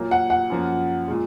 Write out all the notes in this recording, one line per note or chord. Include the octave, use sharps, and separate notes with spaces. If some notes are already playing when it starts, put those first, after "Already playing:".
Already playing: A#2 F#3 A#3
F#5
F#5
F#2 F3 A#3
A#2 G#3